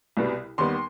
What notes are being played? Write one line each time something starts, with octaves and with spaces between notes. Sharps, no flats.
C2 B2 G3
D#2 D#3 G3 B3 C6